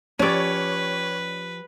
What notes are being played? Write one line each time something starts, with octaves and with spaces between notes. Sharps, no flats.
F3 C#4 G4 B4 C#5 D5